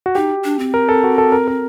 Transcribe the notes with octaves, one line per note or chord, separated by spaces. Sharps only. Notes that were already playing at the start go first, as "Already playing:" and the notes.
F#4
D#4 G4
D4
C4
A#4
A4
F#4
A4
A#4
A#4